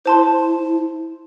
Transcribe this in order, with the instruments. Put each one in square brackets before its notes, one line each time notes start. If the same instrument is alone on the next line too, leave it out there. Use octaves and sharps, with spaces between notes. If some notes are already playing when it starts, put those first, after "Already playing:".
[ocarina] E4 [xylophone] C5 A5 C6